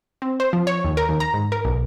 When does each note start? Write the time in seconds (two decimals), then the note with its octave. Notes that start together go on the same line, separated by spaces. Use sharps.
0.22 C4
0.40 C5
0.53 F3
0.67 C#5
0.85 D#2
0.97 A#4
1.09 D#2
1.20 A#5
1.34 G#2
1.52 A#4
1.65 B1